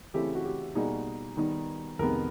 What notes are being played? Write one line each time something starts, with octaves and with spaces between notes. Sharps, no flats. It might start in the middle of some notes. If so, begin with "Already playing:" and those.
C#3 E3 A3 C4 E4 G4
F#4
G4
B2 G3 A#3 D#4 F#4 G#4
D#3 G3 B3 D#4
F2 C3 D#3 G#3 B3 G#4 A#4